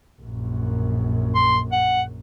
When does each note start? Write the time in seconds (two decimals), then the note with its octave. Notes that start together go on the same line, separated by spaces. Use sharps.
0.22 A#1 F#2
1.35 C6
1.72 F#5